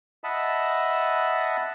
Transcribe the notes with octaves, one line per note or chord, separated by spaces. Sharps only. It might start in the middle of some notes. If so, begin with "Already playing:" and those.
D#5 E5 F#5 A5 B5 D#6